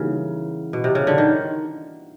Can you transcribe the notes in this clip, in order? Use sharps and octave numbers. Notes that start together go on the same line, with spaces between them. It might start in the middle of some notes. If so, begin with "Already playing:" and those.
Already playing: C#3 E3 G3 A#3 D#4 F#4
B2
C3
C#3
D3
D#3